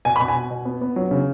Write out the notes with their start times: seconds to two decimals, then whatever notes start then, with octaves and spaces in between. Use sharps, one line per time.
0.05 B2 G#5
0.16 B5
0.20 B2
0.28 G#5
0.35 B2
0.50 B2
0.65 B3
0.81 B3
0.96 F#3
1.11 C#3